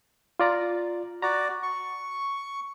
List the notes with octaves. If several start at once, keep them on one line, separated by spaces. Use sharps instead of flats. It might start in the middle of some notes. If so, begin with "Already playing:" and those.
F4 D5 A#5
F#4 D5 A#5
C#6